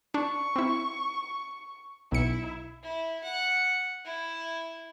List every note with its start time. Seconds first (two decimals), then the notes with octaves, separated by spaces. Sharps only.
0.14 D4 C#6
0.56 C4 E4
2.12 B1 E4 C#7
2.83 E4
3.24 F#5
4.05 E4